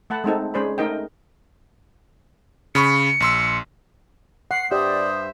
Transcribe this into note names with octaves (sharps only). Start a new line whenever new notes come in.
A3 F#5 A5 B5
G#3 A3 C4 D#4 A4
G#3 C#4 G#4 C5 D5 B5
A3 D#4 A#4 D#5 G5
C#3 B5 C#6 C#7
A#1 C6 E6
F#5 C7
G2 G4 C5 D5 E5 D#6